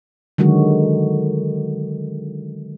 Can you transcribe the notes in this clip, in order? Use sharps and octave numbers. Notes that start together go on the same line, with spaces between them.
D3 D#3 F#3 G#3 F#4